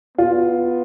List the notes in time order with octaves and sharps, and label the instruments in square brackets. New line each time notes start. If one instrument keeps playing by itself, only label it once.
[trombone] B3 [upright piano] F4